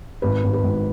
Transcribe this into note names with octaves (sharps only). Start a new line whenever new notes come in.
G#1 B4
G#1
B4
G#1